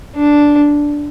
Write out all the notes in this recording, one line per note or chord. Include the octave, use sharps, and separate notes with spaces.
D4